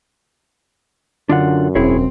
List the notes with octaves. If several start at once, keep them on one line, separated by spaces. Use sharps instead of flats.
F#2 D3 D4 F4 F#5
E1 C4 E4 G#4 C#5